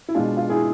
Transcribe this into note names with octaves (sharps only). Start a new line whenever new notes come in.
E4
B2 G#3 D4 F4
F4
E4 G#4